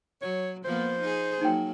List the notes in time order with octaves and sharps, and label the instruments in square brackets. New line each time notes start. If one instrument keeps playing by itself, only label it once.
[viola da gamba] F#3 [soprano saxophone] C#5
[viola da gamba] F3 A#3 B3 [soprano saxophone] C5
[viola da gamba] D#4 G#4
[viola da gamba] F#3 A#3 [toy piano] D#4 G5